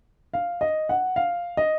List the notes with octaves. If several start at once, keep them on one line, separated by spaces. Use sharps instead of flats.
F5
D#5
F#5
F5
D#5